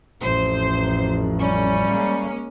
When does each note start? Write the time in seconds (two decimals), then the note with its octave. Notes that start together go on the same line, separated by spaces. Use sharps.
0.22 A1 F2 C5
1.40 G3 C#4
1.88 G#3 A#3